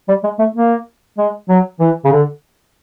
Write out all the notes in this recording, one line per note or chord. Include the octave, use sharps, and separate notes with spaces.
G3
G#3
A3
A#3
G#3
F#3
E3
C#3
D3